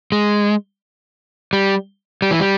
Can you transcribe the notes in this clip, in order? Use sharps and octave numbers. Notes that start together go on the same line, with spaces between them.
G#3
G3
G3
E3
G3